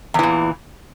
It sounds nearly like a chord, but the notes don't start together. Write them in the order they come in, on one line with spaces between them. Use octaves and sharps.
E2 E3 A#2